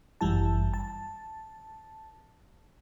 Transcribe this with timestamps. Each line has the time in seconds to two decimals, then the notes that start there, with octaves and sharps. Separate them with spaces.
0.21 G1 F#2 E3 G3 E4 A5
0.74 A5